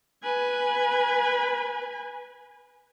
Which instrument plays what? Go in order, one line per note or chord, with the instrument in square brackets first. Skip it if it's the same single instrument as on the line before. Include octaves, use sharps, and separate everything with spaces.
[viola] B4 G#5